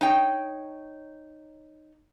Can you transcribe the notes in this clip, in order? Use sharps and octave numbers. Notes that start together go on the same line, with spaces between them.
D#4 C#5 G5